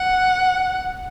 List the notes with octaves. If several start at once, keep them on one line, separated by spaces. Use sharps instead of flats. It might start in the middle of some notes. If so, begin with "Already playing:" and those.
Already playing: F#5